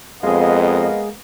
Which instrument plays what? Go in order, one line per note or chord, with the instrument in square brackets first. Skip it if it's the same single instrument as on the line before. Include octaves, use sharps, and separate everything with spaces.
[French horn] F2 [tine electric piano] G#3 G#4 [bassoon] A#3 [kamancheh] B3 D#5